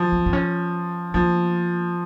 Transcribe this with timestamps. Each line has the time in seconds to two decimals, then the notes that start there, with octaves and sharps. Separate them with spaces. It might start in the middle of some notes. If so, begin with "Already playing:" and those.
Already playing: F3
0.12 C4
0.26 C4
0.33 C#4
1.14 F3 A#3